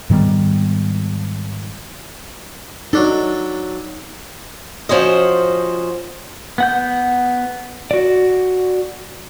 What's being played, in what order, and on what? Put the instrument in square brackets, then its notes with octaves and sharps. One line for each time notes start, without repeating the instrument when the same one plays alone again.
[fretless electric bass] G#2 D#3 G3 B3
[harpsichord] F#3 D4 A4 [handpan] D#4
[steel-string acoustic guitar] F3 C#4 F#4 C5 D#5
[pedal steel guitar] B3 F#5 G6
F#4 D5